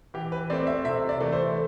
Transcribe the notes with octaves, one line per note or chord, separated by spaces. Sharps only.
E3 G4
B4
A3 C4 D5
E5
C3 E5
D5
E3 A3
C5